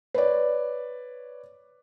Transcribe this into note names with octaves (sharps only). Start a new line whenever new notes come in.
B4 C#5 D5